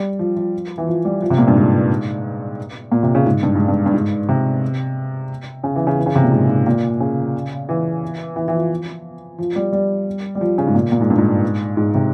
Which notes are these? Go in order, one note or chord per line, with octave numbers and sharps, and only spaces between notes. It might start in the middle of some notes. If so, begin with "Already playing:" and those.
Already playing: G3
F3
F3
E3
F3
G3
F3
C3
A#2
G2
G#2
A#2
C3
C#3
G#2
G2
G#2
G2
G2
G#2
C3
C#3
E3
C#3
E3
C#3
C3
A#2
G#2
G#2
A#2
C#3
E3
E3
E3
F3
F3
G3
G3
G3
F3
C#3
G#2
A#2
A#2
G#2
G2
G#2
G#2
C3